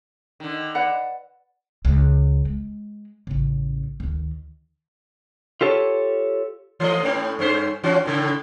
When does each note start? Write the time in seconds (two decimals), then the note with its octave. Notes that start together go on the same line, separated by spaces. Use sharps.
0.40 D3 D#3
0.75 B4 D5 F#5
1.85 C#2
2.45 G#3
3.27 A1 C#3
4.00 D2 D#3
5.61 F4 G4 A4 C#5
6.80 E3 A3 D#5
7.03 A2 A3 C#4
7.39 G2 C#4 C5
7.83 E3 C#4 F#4
8.05 A2 C#3